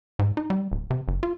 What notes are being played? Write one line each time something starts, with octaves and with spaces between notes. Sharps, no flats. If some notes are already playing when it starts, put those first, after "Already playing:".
G#2
D#4
G3
D1
C3
F#1
F4